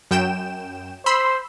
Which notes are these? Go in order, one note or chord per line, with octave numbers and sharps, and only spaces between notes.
F#2 G5 E7
C5 B5 C6 E6